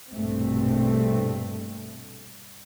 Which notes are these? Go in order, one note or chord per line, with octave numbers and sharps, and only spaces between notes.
A#1 G2 B2 A3 C4